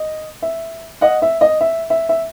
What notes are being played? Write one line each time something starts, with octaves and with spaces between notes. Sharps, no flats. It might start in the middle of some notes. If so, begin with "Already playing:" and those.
Already playing: D#5
E5
D#5 F#5
E5
D#5
E5
E5
E5